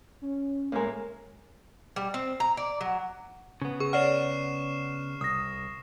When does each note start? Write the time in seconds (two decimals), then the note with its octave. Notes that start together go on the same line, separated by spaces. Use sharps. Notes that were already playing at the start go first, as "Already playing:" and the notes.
0.21 C#4
0.72 A2 G#3 A#3 A#4
1.96 G3
2.14 C4
2.40 A#5
2.57 D5
2.81 F#3
3.62 C#3 B3
3.80 G#4 C#6
3.93 C#5 D5 F#5 F6 C7 E7
5.21 C2 D#6 A#6